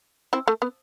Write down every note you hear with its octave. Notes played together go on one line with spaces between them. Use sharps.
C4 E4
A3
B3